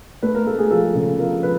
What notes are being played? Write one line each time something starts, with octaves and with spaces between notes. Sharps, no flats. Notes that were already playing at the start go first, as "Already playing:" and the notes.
A3 B4
A#4
A3 A4
G#4
F3 A4
C#3
F3 A#4
F3 B4